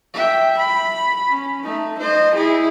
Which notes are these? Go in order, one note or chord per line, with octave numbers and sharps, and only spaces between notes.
E5 G5
B5
C#4
A3 D#4
C5 D#5
E4 G#4